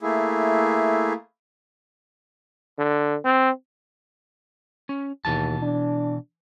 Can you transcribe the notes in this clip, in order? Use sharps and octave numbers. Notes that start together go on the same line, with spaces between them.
A3 A#3 E4 G#4
D3
C4
C#4
D#2 B2 E3 A5
D4